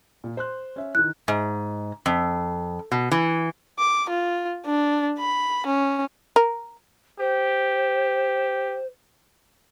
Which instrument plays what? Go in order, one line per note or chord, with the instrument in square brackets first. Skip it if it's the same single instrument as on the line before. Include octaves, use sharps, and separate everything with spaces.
[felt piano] A#2
C5 C6 F#6
C#4 E5
[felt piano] D#3 E3 [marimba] F#6
[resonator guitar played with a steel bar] G#2
F2
B2
E3
[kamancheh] D6
F4
D4
B5
C#4
[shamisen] A#4
[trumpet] G4 [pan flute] C5